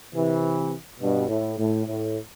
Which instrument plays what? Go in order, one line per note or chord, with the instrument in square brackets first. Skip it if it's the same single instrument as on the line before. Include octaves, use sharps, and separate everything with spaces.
[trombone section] C3 E3
G2 B2
A2
A2
A2